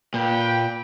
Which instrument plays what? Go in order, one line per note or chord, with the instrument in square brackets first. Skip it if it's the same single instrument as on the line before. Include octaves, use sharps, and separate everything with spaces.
[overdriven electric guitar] A#2 [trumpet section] B4 G5